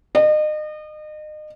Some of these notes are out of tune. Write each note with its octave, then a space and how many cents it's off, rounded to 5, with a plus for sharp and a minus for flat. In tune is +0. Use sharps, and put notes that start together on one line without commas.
D#5 -35